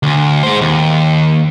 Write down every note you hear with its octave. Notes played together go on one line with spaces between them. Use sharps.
D2
G#3 C5
D#2